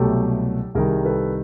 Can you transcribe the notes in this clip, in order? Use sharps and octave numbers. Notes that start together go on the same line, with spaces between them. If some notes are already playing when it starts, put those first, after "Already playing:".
Already playing: C2 B2 F#3 A3 G4 A4
C2 C3 D#3 G3 G#4 A#4
A4 B4